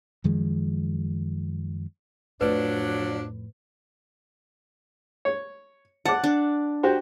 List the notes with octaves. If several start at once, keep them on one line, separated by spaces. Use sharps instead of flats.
F#2 D#3 F3 G#3
F2 A2 F3 F#3 D4 B4
C#5
F#5 A5 D6
D4
F#4 G4 C5